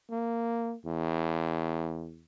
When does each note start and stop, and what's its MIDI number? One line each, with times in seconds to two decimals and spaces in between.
0.11 0.74 58
0.85 2.24 40